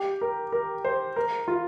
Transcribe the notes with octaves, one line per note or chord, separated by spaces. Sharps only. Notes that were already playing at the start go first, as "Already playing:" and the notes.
Already playing: G4
A#4
A#4
C5
A#4
F4